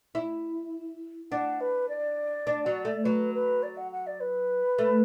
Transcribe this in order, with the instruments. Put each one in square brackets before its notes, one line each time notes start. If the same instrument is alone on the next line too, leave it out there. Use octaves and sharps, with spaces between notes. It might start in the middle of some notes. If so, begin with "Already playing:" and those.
[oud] E4
[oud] D4 [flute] F#5
[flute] B4
D5
[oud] D4
F#3
A3
[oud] F#3 [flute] B4
[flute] B4
D5
F#5
F#5
D5
B4
[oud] A3